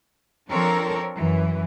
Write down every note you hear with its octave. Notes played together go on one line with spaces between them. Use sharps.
F3 C4 D4 A4 A#4 C#5
F#2 E3